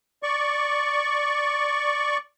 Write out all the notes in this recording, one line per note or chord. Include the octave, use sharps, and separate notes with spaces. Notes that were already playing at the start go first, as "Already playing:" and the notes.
D5 C#6